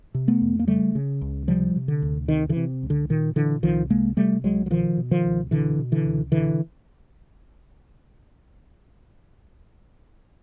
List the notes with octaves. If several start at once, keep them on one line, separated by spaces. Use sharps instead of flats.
C3
A3 B3
F2
A#3
C#3 G3 A3
C#3
C#2
C3 F3 G3
C3
D3
D2
C3 D#3
D3 E3
C3
C#2
D3
A#2 D#3
A#2 D3 E3
C2 D#3 F3
C3 G#3 A#3
C3 G3 A3
C2 F#3 G#3
F#3
B2 D#3 F3
B2
D#3 F3
C#2
B2 D3 E3
B2
D3 E3
C#2
B2 D3 E3